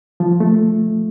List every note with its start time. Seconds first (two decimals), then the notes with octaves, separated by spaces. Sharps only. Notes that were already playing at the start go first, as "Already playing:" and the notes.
0.20 F3
0.40 A3